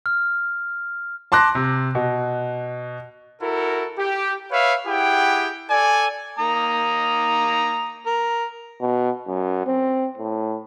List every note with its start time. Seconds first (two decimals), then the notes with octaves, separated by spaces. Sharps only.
0.06 F6
1.32 A5 C6 D6 F#6 A#6
1.55 C3
1.95 B2
3.42 E4 F#4 A4 A#4
3.99 G4
4.52 B4 C#5 E5 F5
4.87 E4 G4 G#4 F#5 G5
5.71 A4 D5 G#5
6.39 A#3 A#5 D#6
8.06 A#4
8.81 B2
9.27 F#2
9.66 C4
10.18 A2